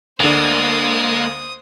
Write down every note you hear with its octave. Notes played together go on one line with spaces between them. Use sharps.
D2 D3 G#3 A#3 C5 D#6